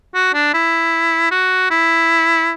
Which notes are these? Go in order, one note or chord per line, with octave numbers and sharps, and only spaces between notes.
F#4
D4
E4
F#4
E4